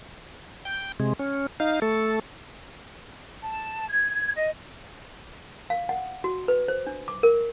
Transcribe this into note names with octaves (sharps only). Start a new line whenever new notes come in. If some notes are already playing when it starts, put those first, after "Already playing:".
G5
C3 G#3
C#4
D#4 F5
A3 A4
A5
G#6
D#5
F5
F#5
F#4
B4
C5
D4
D6
A#4